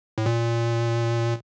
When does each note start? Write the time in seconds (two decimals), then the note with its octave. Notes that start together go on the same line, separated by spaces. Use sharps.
0.18 A2
0.26 A#2